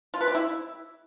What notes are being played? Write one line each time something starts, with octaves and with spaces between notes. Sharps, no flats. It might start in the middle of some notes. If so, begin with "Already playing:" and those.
F4
B4
G4
E4